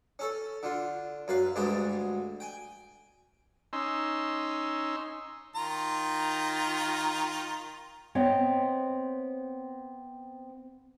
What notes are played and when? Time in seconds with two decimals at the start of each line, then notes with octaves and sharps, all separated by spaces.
0.19 C#4 A4
0.63 D3 F4
1.28 F#2 B4 F5
1.56 D2 G2 G#3 G4 A5
2.40 G5 G#5
3.73 C#4 D#4 C6 E6
5.56 D#3 F4 A#5
8.15 B3 C4 C#5 D#5